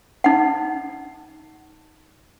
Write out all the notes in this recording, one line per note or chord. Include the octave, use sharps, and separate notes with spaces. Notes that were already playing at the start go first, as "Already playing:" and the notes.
D#4 F#5